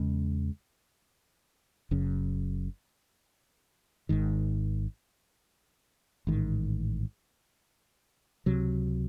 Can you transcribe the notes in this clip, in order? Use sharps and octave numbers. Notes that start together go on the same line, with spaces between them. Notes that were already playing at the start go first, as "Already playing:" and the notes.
Already playing: E2 C#3 G#3
F#1 F#2 C#3
G#1 G#2 D#3
A1 G#2 D#3
C#2 C3 F#3